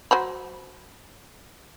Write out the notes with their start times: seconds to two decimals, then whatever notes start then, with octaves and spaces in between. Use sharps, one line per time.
0.11 F#3 C5 B5